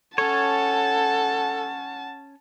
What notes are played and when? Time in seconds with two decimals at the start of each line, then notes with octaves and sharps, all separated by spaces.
0.18 C#4 A4 C#5 F#5 A5